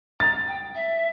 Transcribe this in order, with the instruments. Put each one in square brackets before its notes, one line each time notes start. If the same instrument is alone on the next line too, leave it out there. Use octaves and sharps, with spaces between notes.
[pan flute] A#5 [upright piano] A6
[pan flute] G5
E5